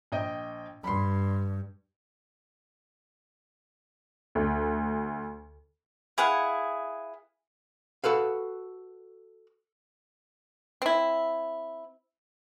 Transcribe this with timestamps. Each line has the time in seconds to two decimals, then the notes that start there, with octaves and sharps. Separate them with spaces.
0.12 A#1 D#5 G5
0.84 G2 B5 C6
4.35 D2
6.18 E4 G#4 F5 F#5
8.04 F#4 A4 B4 F5
10.82 C4 E4